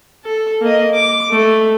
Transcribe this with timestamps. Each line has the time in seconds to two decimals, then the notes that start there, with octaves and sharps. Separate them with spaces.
0.25 A4
0.61 A#3 D#5
0.94 D6
1.31 A3